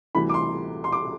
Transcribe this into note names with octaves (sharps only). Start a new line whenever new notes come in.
D2 C3 E3 G3 B5
D6
C6
C6
D6